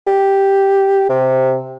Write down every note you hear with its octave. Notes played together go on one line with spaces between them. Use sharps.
G4
C3